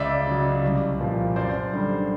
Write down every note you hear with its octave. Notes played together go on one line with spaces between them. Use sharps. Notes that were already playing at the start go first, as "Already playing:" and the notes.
Already playing: C#2 D5 E5
C#3 F#3
C2
A#2 F3
F#2 C5 D5
D3 G3